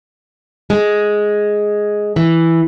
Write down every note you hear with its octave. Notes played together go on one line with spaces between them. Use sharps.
G#3
E3